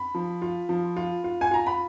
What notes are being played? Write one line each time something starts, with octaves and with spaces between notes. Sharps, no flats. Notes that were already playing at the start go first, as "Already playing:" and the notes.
Already playing: B5
F3
F4
F3
F4
F4
G#5
F4 A#5
B5